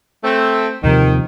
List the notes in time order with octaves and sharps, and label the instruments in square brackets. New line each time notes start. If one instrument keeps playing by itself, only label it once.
[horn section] A3 C4
[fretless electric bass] D#2 C3 F3 [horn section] D#3